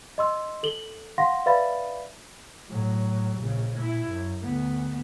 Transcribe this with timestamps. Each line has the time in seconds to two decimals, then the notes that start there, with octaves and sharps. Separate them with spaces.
0.18 D#5 C6 E6
0.63 A4 F#7 G7
1.18 F5 F#5 C6 A#6
1.46 B4 D5 E5 F5 B5 A6
2.68 A2 F#3
3.40 A#1 C#3
3.79 A#2 E4
4.08 F#2
4.43 D2 B3